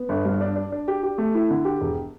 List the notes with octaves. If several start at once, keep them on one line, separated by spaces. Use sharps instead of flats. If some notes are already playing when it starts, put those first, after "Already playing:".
Already playing: B3
G1
G2
D4
D4
D4
G4
G4
A3
E4
D3
G4
E1